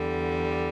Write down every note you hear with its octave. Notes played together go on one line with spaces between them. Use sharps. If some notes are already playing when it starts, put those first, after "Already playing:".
Already playing: E2 D3 G3